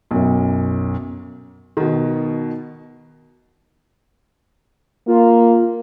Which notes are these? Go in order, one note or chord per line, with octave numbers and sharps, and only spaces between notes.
B1 F#2
B2 D#3
A#3 F4